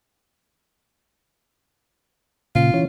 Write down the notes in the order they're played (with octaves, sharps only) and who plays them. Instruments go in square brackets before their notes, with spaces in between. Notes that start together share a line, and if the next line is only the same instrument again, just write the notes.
[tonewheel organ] A#2 C#3 [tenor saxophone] F4
[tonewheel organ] E3 C#4